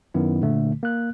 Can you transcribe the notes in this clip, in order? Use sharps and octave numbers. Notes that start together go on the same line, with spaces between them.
F#2 D#3 B3 E4
A#2 D3 A3
A#3 F#6